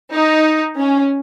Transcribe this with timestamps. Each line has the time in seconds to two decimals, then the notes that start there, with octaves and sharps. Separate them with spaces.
0.13 D#4
0.77 C#4